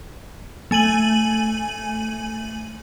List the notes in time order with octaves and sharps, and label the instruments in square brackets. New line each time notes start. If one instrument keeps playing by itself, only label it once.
[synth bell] A3 G#5 D#7 F#7